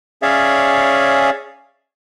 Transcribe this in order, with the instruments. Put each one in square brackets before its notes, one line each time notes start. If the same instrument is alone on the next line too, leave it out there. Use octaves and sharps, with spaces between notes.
[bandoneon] C#4 G#4 C#5 D5 E5 F5